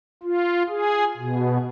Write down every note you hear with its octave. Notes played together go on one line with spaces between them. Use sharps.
F4
G#4
B2